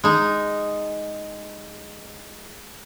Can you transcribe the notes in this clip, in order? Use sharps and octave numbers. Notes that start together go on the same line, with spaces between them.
G#3 D#4